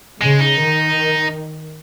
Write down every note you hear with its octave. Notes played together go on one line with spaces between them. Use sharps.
C#3 G#3
D#4
D#3